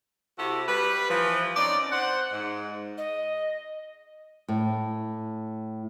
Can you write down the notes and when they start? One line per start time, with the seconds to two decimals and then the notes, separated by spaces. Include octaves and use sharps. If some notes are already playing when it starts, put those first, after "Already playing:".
0.38 C3 E4 F#4 G4 A4
0.68 G3 B4
1.10 E3 F3
1.57 C4 C#4 D#4 D5
1.92 C5 F#5
2.33 G#2
2.98 D#5
4.48 A2